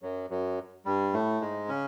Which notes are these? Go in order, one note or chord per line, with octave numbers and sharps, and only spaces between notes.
F#2 F#3
F#2 F#3
G2 G3
A2 A3
G#2 G#3
C#3 C#4